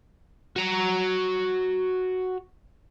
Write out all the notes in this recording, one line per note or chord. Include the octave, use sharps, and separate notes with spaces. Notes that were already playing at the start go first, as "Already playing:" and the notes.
F#4 A#5